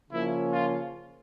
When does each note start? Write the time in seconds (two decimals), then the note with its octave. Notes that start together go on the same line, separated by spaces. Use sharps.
0.10 C#3 F3 A#3 C#4 E4
0.53 F4